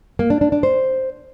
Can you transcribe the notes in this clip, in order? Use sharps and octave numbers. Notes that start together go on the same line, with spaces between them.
A#3
D4
D4
D4
C5